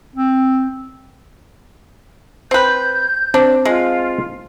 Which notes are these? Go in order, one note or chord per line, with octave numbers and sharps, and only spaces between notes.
C4
C4 B4 G6
C4 D4
G#3 F4